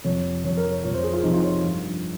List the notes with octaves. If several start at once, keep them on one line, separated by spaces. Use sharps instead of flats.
F2 C3 F3 C#5
F2 C3 F3 C#5
A#4
C#5
F2 C3 F3 C#5
C5
G#4
F4
F2 C3 F3 D#4
F4
C#5
G2 F3